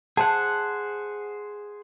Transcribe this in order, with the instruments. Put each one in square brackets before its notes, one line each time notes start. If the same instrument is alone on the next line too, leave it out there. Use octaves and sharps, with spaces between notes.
[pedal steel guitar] G#4 C5 F#5 [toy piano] A5